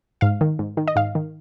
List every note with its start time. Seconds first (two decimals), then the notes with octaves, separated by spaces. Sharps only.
0.21 G#2 F5
0.41 D#3
0.59 G#2
0.77 D#3
0.87 D#5
0.96 G#2 F5
1.15 D#3